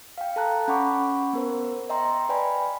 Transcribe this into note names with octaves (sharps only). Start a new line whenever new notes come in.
F5 G5
A4 A5 A#5 F#6
C#4 F#5 B5 C#6 D6
B3 A#4 C5
D#5 E5 G5 A#5 C6
B4 D5 G5 G#5 B5